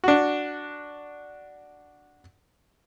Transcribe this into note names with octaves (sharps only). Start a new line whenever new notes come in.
D4 F#4